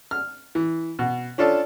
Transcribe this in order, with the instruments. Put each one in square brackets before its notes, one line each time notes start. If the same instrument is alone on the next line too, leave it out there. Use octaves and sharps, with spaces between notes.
[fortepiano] F6
E3
B2
C#4 D4 F4 A4